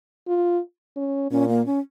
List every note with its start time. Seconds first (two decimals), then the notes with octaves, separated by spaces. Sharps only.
0.28 F4
0.96 C#4
1.31 A#2 C#4
1.49 A#3
1.66 C#4